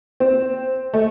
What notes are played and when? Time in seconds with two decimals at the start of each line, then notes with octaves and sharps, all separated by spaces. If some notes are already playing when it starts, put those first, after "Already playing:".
0.20 C4
0.94 A3